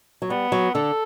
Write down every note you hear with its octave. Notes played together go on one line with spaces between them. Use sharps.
F#3
G3 B3
F#3
D3 A4